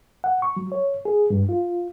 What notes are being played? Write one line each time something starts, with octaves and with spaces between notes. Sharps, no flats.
F#5
C#6
F#3
C#5
G#4
G2
F4